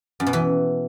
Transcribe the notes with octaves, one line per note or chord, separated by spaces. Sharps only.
F#2
B2
E3